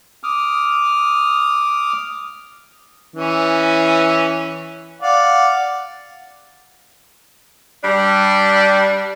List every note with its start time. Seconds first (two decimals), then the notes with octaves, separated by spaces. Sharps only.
0.24 D6 D#6 F6
3.16 E3 C#4
5.02 D5 F5 F#5
7.83 G3 D4